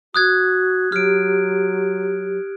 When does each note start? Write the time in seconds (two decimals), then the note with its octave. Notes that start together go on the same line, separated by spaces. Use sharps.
0.14 F#4 D#6 F#6 G#6
0.92 F#3 G4 F6 D7